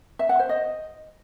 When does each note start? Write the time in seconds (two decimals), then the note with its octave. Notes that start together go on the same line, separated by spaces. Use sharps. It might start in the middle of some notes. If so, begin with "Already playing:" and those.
0.19 E5
0.29 F#5
0.39 C5
0.49 D#5